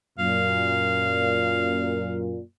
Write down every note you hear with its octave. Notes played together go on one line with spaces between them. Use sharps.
F#2 A#2 F5